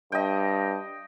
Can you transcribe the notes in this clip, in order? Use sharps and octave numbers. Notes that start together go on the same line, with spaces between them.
G2 D#5 G5